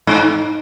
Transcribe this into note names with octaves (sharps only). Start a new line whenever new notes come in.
G#2 D#4